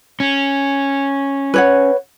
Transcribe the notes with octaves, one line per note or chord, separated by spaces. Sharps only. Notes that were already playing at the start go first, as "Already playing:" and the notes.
C#4
B4 C#5 F#5